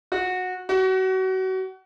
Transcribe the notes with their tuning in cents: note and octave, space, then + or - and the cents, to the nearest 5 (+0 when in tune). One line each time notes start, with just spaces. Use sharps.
F#4 -15
F#4 +30